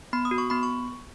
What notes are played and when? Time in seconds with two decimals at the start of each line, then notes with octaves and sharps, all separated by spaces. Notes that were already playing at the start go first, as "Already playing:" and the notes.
0.13 B3 B5
0.25 D#6
0.31 F#4
0.38 C#6
0.50 B3 B5
0.63 C#6